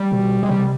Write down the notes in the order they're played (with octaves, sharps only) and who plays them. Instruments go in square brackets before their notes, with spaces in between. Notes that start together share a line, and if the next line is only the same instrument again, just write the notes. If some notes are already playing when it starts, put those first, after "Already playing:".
Already playing: [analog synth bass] G3
[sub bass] B2
[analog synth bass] G#3
[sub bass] C3 [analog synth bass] G3